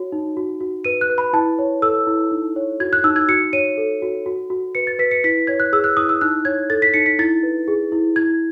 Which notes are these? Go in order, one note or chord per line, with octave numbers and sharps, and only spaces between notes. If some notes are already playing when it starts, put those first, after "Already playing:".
Already playing: F#4 C#5
D#4
F#4
F#4
B4 D#7
F#6
B4
B5
E4 A5
C#5
A4 E6
E4
D#4
C#5
F#4 G#6
F#6
D#4 E6
G#6
F#4 C#7
C#5 D#7
A4
F#4
F#4
F#4
B4 C#7
A6
B4 B6
C#7
E4 B6
C#5 G#6
F#6
G#4 E6
F#6
E4 D#6
E6
D#4 F#6
C#5 G#6
A4 A6
B6
D#4 C#7
B6
E4 A6
B4
G#4
E4
E4 G#6